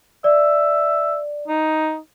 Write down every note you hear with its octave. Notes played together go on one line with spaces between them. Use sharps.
D5 E5
D#4